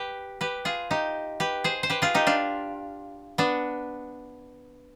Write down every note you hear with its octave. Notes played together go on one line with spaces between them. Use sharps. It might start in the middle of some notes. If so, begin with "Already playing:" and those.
Already playing: G4 B4
G4 B4
F4 G#4
D#4 G4
G4 B4
G#4 C5
C5
G4 B4
F4 G#4
D#4 G4
D4 F4
B3 D4